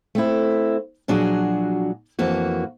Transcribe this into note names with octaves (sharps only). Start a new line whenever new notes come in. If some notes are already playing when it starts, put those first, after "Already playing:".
A3 C4 E4
A#2 F3 F#3 D4 F#4 G#4
F2 E3 A#3 F#4